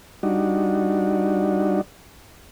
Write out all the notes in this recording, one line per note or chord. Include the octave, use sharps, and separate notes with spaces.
G3 D4 D#4 F#4